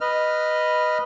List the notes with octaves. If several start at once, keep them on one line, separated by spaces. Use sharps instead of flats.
B4 D#5 F6